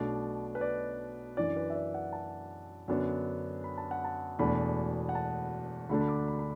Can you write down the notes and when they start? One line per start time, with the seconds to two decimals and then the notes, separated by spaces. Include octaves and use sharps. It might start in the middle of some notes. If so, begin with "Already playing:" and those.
Already playing: B1 B2 A3 D4 D5
0.55 B4
0.61 D5
1.37 F#2 E3 D4 D5
1.56 B4
1.70 E5
1.75 D5
1.94 F#5
2.13 A5
2.88 F#2 D3 F#3 B3 D4
3.64 B5
3.78 A5
3.91 F#5
4.04 A5
4.39 E1 E2 B2 A3 D4 B5
5.09 F#5
5.15 A5
5.89 D2 D3 A3 D4 B5
6.01 B5
6.08 D6
6.28 B5
6.39 B5